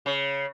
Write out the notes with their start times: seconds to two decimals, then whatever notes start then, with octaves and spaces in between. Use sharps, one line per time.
0.06 C#3